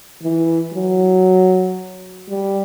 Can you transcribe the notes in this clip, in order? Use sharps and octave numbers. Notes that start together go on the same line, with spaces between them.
E3
F#3
G3